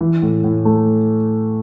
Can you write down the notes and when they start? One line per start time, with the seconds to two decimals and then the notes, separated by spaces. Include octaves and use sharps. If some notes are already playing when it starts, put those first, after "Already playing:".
0.01 E3
0.22 A2
0.44 A2
0.65 A3